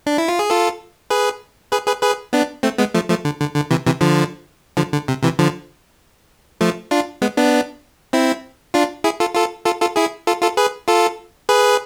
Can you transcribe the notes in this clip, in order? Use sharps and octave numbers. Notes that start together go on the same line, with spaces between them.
D4
E4
F4
G#4
F4 A4
G#4 B4
G#4 B4
G#4 B4
G#4 B4
B3 D4
A3 C4
G#3 B3
F3 A3
F3 A3
D3
D3
D3
C3 E3
C3 E3
D3 F3
D3 F3
D3
C3
C3 E3
D3 F3
F3 A3
D4 F4
G#3 B3
B3 D4
C4 E4
D4 F4
E4 G#4
F4 A4
F4 A4
F4 A4
F4 A4
E4 G#4
F4 A4
F4 A4
G#4 B4
F4 A4
G#4 B4